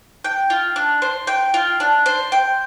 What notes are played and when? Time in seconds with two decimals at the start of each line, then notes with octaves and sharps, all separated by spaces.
0.24 G5
0.50 F4
0.76 D4
1.02 C5
1.27 G5
1.54 F4
1.80 D4
2.06 C5
2.32 G5